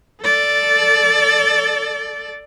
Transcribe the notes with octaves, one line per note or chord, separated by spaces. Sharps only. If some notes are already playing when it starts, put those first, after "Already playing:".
A4 D5